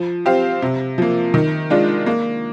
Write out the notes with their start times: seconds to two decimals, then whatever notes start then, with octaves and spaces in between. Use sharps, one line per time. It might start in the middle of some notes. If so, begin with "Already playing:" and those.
Already playing: F3
0.26 C4 G4 C5 F5
0.62 C3
0.98 F3 A#3
1.34 D#3
1.70 G#3 D4 F4
2.06 A#3